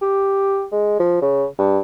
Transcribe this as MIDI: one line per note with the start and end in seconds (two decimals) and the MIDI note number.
0.02 0.65 67
0.72 0.94 56
1.00 1.20 53
1.22 1.46 49
1.59 1.80 43